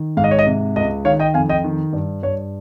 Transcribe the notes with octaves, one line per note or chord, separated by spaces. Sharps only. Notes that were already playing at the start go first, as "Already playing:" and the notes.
Already playing: D#3
G#2 F5
D#5
C#5
D#5
C3
C#2 D#5
D#3 C#5 F5
D#5 G5
F2 F5 G#5
D#5 G5
D#3
G2
G2 C#5